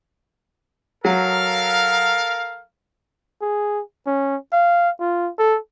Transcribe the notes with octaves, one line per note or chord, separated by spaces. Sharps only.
F#3 A4 A#4 F5
G#4
C#4
F5
F4
A4